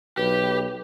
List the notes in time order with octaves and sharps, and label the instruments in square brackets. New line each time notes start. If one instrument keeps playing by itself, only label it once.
[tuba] B1 [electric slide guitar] G4 [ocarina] B4